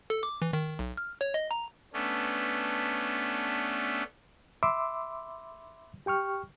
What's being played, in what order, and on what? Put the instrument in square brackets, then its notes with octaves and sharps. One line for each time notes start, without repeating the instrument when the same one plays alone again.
[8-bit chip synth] A4
D6
E3
D#3
B1
F6
C#5
D#5
A#5
[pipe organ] A3 B3 C#4 D4
[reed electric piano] E5 B5 C6 D6 E6
G4 G5 C#6 F6